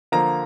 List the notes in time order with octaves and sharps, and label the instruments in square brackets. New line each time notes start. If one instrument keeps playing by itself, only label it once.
[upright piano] D3 F3 A#3 A#5